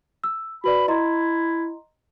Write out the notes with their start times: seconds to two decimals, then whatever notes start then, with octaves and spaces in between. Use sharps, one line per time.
0.24 E6
0.64 F#4 B4 D5 B5
0.88 E4 D#5 A#5 C6